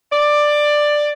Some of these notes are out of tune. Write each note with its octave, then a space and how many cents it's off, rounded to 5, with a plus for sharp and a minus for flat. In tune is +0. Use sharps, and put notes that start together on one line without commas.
D5 +10